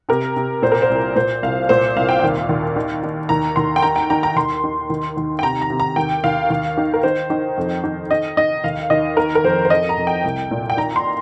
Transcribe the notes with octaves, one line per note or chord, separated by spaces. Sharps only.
C3 A#4
C3
A#2 C5
A#4
C5
C2
A#2 C5
C2 F5
A#2 C5
C2 F5
G5
D#2 F5
D#2
D#3
D#3
D#2 A#5
D#2 C6
G5
D#3 A#5
G5
D#3 A#5
A#5
D#2 C6
D#3
D#2
D#2
G5
C3 A#5
A#5
C3
A#5
D#2 G5
D#2 F5
D#2
D#3
A#4
D#3 C5
D#3
F2
D#3
D#3 D#5
D#3 D#5
D#2 F5
D#2 D#5
D#3 A#4
A#4
F2 C5
C5
F2 D#5
A#5
F2
G5
C2
A#2
G5
D#3 A#5
C6